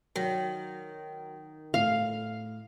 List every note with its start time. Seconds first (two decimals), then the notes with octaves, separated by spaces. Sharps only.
0.16 D#3 F#3
1.74 A2 F5